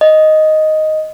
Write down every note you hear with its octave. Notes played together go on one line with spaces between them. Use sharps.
D#5